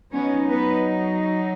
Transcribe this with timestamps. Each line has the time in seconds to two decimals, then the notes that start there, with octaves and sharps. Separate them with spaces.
0.13 F#3 B3 C#4 D#4 C#5
0.48 B3 B4